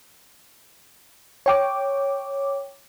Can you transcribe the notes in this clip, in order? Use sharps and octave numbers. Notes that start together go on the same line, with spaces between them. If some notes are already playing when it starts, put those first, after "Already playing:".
C#5 G5 D6